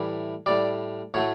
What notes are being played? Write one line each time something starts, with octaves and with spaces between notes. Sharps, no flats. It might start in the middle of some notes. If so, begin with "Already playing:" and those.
Already playing: A2 E3 G3
A2 G3 D5
A2 F#3 A3 C#5